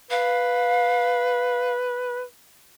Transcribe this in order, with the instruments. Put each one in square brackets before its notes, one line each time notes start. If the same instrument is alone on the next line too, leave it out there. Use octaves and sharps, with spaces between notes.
[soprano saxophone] B4 [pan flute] F5